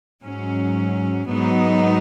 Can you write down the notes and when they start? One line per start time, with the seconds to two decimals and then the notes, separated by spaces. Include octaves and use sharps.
0.23 G#2 F#3 C#4
1.28 G#2 F#3 B3 D#4